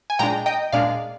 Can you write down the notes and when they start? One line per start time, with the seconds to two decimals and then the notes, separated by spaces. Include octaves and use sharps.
0.10 G#5
0.19 A#2 G#3 D4 G5 A#5
0.46 D#5 G5
0.72 A#2 G#3 D4 D5 F5